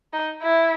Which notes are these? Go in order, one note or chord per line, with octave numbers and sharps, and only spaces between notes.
D#4
E4